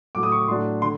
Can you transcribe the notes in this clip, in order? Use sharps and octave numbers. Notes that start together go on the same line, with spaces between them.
A2 F#3 A3 D6
D#6
C#6
A2 F#3 A3 D4 C6
D3 C6